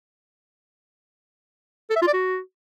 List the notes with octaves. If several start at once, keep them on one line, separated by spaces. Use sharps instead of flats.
A4
E5
F4
D5
F#4